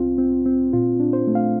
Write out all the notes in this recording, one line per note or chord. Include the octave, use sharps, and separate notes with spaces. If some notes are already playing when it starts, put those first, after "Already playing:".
Already playing: C2 C4 F4
C4
C4
A#2 F4
D4
C5
A3
F5